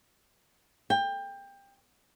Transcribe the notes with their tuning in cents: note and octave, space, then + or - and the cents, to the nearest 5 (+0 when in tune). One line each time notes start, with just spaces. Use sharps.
G5 +20